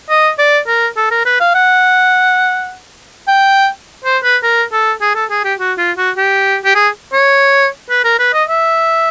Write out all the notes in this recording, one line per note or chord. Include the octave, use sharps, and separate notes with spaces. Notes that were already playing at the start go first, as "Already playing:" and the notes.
D#5
D5
A#4
A4
A#4
B4
F5
F#5
G5
C5
B4
A#4
A4
G#4
A4
G#4
G4
F#4
F4
F#4
G4
G4
G#4
C#5
B4
A#4
B4
D#5
E5